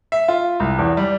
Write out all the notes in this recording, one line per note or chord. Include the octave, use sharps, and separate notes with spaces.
E5
F4
C2
E2
G3